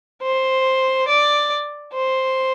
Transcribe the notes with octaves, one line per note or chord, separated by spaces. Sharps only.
C5
D5
C5